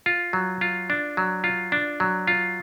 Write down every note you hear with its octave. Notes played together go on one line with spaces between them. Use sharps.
F4
F#3
F4
D4
F#3
F4
D4
F#3
F4